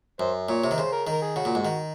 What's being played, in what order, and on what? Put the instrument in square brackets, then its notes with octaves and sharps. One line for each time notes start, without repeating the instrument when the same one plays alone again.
[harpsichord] F#2 [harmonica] C5
[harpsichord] A#2 [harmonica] C#5
[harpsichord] C3
D#3
[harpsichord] C#3 [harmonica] C5
[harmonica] A#4
[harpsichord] D#3
[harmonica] A#4
G#4
[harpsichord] C#3 [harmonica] F#4
[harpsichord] A#2
G#2
D#3